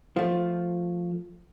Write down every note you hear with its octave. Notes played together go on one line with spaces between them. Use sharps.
F3 A3